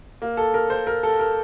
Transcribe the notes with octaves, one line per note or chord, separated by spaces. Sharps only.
A#3
A4
A#4
C5
A#4
A4
A#4